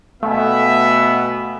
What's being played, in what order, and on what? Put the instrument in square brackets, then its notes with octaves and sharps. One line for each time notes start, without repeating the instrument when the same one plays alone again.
[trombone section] B2 B3 [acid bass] A3 [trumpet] E5 [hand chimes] F5 G5 G#5